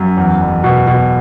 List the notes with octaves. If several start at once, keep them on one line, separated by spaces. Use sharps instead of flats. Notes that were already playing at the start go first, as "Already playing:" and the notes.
Already playing: F#2
E2
F#1
B2
B2